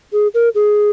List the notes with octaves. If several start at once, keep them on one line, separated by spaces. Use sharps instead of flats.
G#4
A#4
G#4